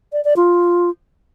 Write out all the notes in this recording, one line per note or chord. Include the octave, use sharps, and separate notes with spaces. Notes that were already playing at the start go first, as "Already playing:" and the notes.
D5
D5
F4